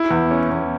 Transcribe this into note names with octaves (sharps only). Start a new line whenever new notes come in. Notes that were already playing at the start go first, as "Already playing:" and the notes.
Already playing: E4
E2
C#4
E2